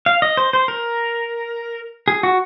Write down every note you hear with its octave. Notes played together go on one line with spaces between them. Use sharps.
F5
D#5
C5
C5
A#4
G#4
F#4